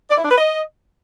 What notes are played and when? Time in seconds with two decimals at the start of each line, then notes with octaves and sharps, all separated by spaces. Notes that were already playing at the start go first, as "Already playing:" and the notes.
0.10 D5
0.17 E4
0.24 D4
0.31 B4
0.38 D#5